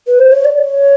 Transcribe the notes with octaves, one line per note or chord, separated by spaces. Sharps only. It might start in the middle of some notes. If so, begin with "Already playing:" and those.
B4
C5
C#5
D5
C#5